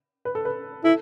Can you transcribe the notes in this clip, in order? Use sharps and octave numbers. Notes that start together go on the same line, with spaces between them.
B4
A4
B4
E4 A4